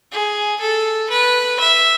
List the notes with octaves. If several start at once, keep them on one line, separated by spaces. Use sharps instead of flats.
G#4
A4
B4
E5